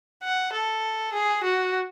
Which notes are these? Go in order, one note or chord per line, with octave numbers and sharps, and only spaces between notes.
F#5
A4
G#4
F#4